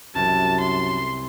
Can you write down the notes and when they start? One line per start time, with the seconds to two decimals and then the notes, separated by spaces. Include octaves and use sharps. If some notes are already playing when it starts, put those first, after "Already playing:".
0.15 C2 F#2 A5
0.61 C6